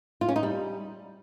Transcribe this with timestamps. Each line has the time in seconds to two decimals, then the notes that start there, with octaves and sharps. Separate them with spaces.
0.21 F4
0.29 C#4
0.36 D#4
0.43 G3